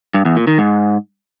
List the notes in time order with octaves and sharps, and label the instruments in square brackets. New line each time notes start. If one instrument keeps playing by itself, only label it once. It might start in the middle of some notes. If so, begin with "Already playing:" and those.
[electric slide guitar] G2
E2
A#2
D#3
G#2